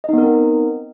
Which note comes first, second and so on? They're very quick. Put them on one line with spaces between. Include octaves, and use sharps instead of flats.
D#5 D#4 B3 A#4 C4